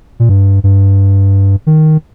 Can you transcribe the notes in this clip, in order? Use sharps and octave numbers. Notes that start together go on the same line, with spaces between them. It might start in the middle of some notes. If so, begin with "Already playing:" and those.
A#2
G2
G2
D#3